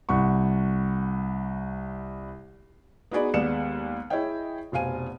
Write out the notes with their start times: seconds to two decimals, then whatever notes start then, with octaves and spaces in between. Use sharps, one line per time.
0.09 C2 F#5 C#6
3.11 B3 D#4 F#4 G#4 D5 B5
3.34 D#2 G#3 B3 D5 C#7 E7
4.10 E4 G#4 C#5 D#5 G5
4.72 F1 B2 C5 F5 G#5 D#7